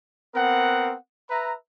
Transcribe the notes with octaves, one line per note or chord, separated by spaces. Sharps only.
B3 C4 A#4 F#5
B4 E5 A#5